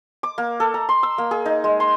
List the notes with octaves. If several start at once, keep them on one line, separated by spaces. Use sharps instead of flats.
D6
A#3
A4
A#5
C6
E6
A#3
G#4
D#4
G#3
C6